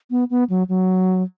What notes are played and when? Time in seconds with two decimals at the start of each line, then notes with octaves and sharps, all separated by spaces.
0.11 B3
0.30 B3
0.50 F#3
0.69 F#3